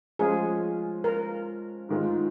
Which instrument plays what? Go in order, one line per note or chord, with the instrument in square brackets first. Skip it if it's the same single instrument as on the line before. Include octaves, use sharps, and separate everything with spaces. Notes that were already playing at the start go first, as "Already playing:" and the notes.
[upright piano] F3 G#3 C#4 F4 [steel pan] G#4
[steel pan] A#4
[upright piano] G#2 D#3 G#3 F4